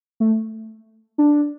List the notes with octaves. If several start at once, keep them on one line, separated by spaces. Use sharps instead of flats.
A3
D4